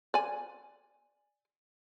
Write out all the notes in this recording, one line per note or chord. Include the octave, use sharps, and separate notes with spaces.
D5 G#5